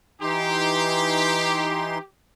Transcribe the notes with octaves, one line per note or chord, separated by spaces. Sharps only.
E3 D#4 G4 C6